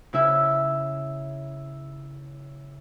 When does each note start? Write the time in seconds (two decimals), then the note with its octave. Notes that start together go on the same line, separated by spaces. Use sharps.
0.13 C#3 E4 E5